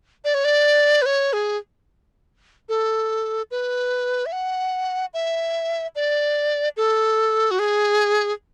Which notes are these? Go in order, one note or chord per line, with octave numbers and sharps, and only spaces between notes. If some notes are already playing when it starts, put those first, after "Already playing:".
D5
C#5
D5
B4
C#5
G#4
A4
B4
E5
F#5
E5
D5
A4
F#4
G#4